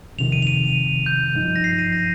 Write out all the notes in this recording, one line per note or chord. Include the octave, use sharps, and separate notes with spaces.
F2 C3 D#3 F7
D#7
F7
D#7
G6
G2 F3 D#4
A#6
C7
D#7
A#6